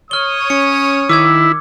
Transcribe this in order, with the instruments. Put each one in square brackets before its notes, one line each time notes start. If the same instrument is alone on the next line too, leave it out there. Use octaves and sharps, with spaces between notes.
[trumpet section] C#5 D#6 [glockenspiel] F6 G7
[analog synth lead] C#4 [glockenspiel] C#7
[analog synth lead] D#3 [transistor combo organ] E4 [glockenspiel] D6 E6 G#6